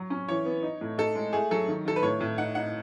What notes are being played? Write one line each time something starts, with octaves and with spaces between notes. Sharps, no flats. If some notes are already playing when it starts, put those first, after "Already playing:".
Already playing: F#3
C#4
E3 C#5
B3
D#4
A2
D#4 A4
G#3
A3 G#4
F#3 A4
D#3
D#3 A4
B4
A2 C#5
A2
D#4 F#5
D#4 F#5